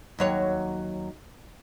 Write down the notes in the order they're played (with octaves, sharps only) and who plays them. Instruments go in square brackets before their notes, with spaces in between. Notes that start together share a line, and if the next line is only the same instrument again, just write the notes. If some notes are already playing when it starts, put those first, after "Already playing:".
[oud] D#2 F#3 C#5